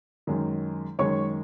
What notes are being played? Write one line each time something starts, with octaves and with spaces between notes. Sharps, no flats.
F#2 D#3 G#3
F#2 D#3 G#3 C#5 C#6